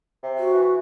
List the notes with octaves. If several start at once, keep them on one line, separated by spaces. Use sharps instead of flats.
C3
F#4
E3